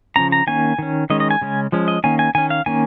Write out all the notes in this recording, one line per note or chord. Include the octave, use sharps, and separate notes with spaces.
C#3 F3 C#4 A#5
A#5
D#3 A#3 C#4 G#5
D#3 C#4
D#3 G#3 C#4 D#5
D#5
G#5
C#3 G#3 C#4
F3 G#3 C#4
D#5
D#3 A#3 C#4 G#5
G#5
D#3 C#4 G#5
F5
D#3 A#3 C#4 G#5